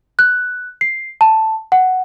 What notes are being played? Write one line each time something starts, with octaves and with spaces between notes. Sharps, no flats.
F#6
C7
A5
F#5